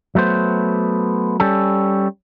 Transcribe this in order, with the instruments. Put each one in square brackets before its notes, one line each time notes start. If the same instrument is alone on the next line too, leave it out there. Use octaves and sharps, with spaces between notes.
[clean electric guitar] F#3 A3 B3 C5
G3 C#4 A4